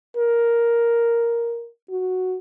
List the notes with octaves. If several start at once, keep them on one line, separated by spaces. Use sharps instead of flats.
A#4
F#4